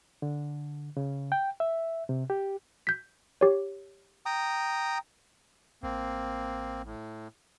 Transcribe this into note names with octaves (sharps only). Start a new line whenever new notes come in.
D3
C#3
G5
E5
C3
G4
G6 B6
G4 C#5
G5 A#5 D#6
A1 A#3 C4
A2